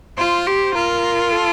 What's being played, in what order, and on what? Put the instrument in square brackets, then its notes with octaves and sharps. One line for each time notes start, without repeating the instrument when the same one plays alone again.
[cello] F4 [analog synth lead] C5
[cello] G4
[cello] F4 [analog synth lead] A#4
[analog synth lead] A4